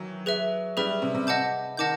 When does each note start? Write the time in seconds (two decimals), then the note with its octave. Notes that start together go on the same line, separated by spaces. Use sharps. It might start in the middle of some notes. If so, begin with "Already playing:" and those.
Already playing: D#3 E3 F#3
0.26 G#4 B4 E5
0.77 G3 G#4 B4 E5
1.02 C3
1.14 C3
1.27 D#5 F#5 A5 D6 G6
1.77 D#3 D#5 F#5 A5 D6 G6